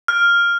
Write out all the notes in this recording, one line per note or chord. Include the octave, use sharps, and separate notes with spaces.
F6